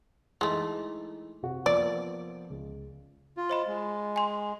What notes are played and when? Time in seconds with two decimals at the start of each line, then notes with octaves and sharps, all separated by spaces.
0.41 E3 G#3 A3 D#4
1.43 C3 F#4
1.66 F3 A#3 B3 D5
2.50 C#2
3.37 F4
3.49 C5 D#5 B5
3.67 G#3
4.16 G#5 C6